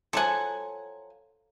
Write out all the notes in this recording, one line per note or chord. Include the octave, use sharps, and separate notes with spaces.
F3 F#3 A4 F#5 G#5